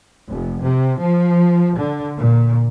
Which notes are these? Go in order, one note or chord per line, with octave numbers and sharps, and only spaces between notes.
F1
C3
F3
D3
A#2